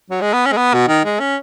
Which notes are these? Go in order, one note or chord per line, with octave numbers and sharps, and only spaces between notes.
F#3
G#3
B3
C#4
G#3
B3
B2
D#3
G#3
C#4